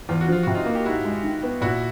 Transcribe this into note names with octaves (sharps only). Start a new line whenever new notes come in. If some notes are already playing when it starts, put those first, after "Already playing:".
E2 F4
F#4
F3 F4
C3 F#4
D#4 F4
A#3
G4
G#2 E4 F#4
G#3
D#3
B3
A#2 E4 F#4